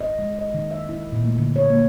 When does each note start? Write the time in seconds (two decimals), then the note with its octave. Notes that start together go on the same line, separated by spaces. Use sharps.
0.01 D#5
0.19 G#3
0.39 D#5
0.54 D#3
0.71 E5
0.89 E4
1.12 A#2
1.25 A3
1.38 D3
1.56 C#5
1.70 A#3